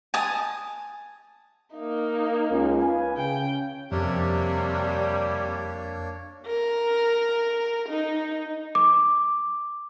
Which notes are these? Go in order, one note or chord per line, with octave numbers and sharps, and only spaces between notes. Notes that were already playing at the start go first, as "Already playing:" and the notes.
G#5 A5 D#6
A#3 D#4
C#2
B4 F5 G#5
C#3 G5
F2 C3 G3 A#3 D4 C#5
A#4
D#4
D6